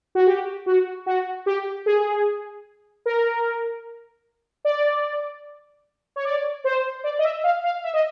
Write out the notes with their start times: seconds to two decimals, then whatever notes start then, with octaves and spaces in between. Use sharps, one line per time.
0.15 F#4
0.27 G4
0.66 F#4
1.06 F#4
1.46 G4
1.86 G#4
3.06 A#4
4.65 D5
6.16 C#5
6.24 D5
6.64 C5
7.04 D5
7.19 D#5
7.24 E5
7.44 F5
7.64 F5
7.84 E5
7.94 D#5